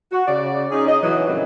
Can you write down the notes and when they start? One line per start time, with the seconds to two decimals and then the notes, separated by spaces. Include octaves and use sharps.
0.12 F#4
0.28 C#3 D5
0.72 C#4 D#4 G#4
0.87 D#5
1.02 B2 E3 F#3
1.27 F2 A#2 C#3 E3 F#3 G3